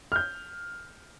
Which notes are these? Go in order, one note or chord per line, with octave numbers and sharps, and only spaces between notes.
F6 G6